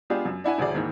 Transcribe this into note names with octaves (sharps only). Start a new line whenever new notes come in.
G#3 B3 D4 F4 G4 G#4
F#2
D4 E4 F#5 G#5
D#1 D2 E3 G#4 D5
G#2 D#3 E3 A#3